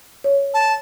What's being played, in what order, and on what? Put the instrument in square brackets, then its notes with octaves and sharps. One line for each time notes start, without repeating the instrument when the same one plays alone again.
[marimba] C#5
[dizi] A5